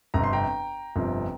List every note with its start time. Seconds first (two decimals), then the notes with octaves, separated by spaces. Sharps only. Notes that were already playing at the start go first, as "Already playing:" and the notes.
0.14 G1 F2 C3 A#5
0.24 C6
0.33 G5 A#5
0.96 G1 F2 C3 F3